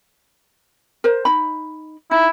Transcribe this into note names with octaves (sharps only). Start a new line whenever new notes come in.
A#4 C5
D#4 B5
D#4 E4